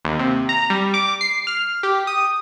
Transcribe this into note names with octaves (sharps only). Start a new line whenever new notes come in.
D#2
C3
A#5
G3
D6
C7
F6
G4
D#6